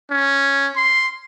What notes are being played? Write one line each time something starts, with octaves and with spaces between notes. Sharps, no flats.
C#4
C6